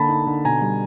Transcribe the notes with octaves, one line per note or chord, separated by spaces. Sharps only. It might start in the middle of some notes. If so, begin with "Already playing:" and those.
Already playing: D3 A#3 A5 B5
D#4
D3
B2 G#5 A#5
G3